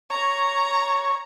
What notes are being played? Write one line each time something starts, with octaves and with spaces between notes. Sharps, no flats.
C#5 A#5